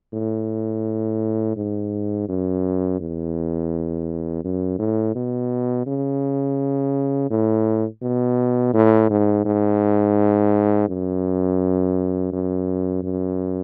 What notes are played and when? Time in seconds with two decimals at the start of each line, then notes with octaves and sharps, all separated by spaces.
0.13 A2
1.57 G#2
2.29 F#2
3.00 E2
4.44 F#2
4.79 A2
5.15 B2
5.87 C#3
7.31 A2
8.02 B2
8.74 A2
9.10 G#2
9.45 G#2
10.88 F#2
12.33 F#2
13.03 F#2